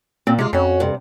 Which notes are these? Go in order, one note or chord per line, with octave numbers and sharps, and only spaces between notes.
A#2 C4
C3 G#3 F4
F2 C#4 F#4
G2 C3